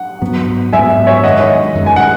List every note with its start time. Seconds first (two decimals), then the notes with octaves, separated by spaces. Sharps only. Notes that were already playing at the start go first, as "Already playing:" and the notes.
Already playing: F#5
0.21 G#2 F#3 B3
0.73 G#2 F#3 B3 E5 G#5
1.07 C#5 E5
1.23 F#2 D#3 G#3 D#5 F#5
1.75 F#2 D#3 G#3
1.86 G#5
1.96 F#5